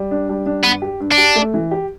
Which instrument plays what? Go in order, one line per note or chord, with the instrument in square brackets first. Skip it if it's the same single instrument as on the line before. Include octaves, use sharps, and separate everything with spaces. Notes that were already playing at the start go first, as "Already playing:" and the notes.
Already playing: [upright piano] G3
D4
G3
D4
[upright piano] G2 [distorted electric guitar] B3
[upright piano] G4
G2
[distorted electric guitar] D4
[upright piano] G4
A3
E3
G4